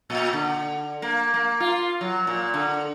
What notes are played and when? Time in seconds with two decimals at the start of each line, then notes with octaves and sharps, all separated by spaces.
0.10 A#2
0.33 D3
1.02 A#3
1.34 A#3
1.60 F4
2.01 F#3
2.27 A#2
2.54 D3